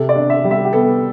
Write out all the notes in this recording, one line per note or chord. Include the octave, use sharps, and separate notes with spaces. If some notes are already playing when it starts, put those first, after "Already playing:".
Already playing: C3 A4
D5
D4
E5
G3
E5
G4
B3 A4